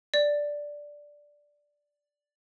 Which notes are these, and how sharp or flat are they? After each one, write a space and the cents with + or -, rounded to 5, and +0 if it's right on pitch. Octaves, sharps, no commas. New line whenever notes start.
D5 -5